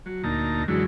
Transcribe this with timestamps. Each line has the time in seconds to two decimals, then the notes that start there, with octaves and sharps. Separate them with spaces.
0.06 F#3
0.23 D2 A#2 D#4 A5 A#5
0.68 F#2 D3 E3 F#3 G#3